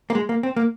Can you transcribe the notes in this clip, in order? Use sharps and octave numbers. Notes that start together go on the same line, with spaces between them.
A#3
G#3
A#3
C4
A#3